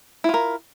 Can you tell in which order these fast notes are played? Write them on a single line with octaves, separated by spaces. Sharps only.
E4 F4 A#4